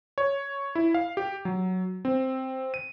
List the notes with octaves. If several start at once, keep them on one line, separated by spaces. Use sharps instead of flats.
C#5
E4
F5
G4
F#3
C4
D#7